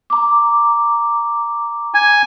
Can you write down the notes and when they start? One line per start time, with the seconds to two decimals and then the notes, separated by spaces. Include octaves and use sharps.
0.10 A#5 D6
1.94 G#5